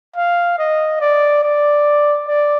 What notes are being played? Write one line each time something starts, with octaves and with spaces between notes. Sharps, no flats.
F5
D#5
D5
D5
D5